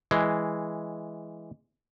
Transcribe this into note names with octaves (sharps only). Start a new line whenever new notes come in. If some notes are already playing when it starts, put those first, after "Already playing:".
E3 G#3